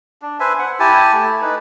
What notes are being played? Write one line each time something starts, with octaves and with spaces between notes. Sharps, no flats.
D4
B4 C5 E5 G#5
F#5
E4 G4 G#5 A5
A3
D#4 B4